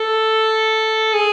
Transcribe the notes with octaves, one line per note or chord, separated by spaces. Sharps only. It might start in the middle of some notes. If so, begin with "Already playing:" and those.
Already playing: A4
G#4